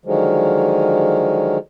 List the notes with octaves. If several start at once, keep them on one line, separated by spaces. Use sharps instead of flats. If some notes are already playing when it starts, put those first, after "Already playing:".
D3 D#3 F3 F#3 G#3